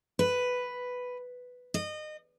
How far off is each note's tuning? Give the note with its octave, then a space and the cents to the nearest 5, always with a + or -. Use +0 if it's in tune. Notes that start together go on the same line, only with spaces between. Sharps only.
B4 +5
D#5 -25